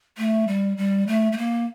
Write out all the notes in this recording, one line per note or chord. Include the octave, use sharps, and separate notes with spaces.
A3
G3
G3
A3
A3
A#3